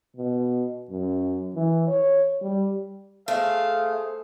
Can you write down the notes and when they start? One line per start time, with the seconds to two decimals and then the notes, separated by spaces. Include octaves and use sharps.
0.16 B2
0.90 F#2
1.54 E3
1.87 C#5
2.41 G3
3.28 A3 G#4 C5 F5